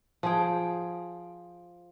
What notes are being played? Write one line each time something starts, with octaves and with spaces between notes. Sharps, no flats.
F3 G#4 G5